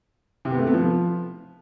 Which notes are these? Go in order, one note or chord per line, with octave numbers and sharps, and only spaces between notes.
C3
B3
A3
B3
F3